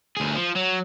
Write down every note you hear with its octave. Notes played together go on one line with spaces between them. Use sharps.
D2 G#4
F3
F#3